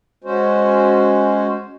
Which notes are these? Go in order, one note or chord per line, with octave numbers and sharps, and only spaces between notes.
G#3 C#4 F#4 C5